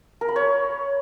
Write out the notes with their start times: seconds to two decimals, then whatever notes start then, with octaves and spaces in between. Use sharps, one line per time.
0.21 A#4
0.28 B5
0.36 C#5